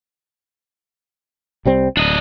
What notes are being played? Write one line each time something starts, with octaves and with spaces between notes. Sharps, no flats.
C2 G3 C4
D1 D4 D#5